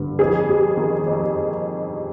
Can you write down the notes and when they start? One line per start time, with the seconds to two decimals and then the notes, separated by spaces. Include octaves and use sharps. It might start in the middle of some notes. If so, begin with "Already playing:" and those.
Already playing: G2 D3
0.19 F2 G#4
0.49 G3
0.77 D#3
1.07 F2